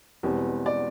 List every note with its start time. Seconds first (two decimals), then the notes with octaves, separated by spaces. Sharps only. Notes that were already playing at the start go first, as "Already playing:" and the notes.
0.23 E1 E2 B2 G3 C4
0.66 D5